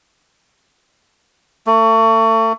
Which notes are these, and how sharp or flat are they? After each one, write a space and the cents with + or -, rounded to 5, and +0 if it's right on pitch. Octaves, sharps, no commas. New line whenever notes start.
A3 +35